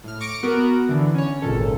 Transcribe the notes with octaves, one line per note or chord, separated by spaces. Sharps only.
A2 F6
C#6 D6 A#6 C#7 D7
B3 F#4 A#4 F#5
D3 E3
C#4 C#5
G#1 C#2 A#2 A4